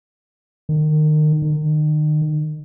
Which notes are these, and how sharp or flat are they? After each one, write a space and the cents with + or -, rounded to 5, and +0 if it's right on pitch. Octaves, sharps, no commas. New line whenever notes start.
D#3 -30
D#3 -35